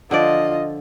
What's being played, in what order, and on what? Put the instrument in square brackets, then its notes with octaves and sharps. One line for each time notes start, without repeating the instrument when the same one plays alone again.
[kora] D3 F3 D5 [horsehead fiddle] F4 D#5